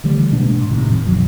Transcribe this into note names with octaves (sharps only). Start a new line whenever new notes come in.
D3 E3 G3 A3
B2 G#3 A#3 D4
G#2
A2 C3 D#3
F1 F3
F#2 B2 D#3 F#3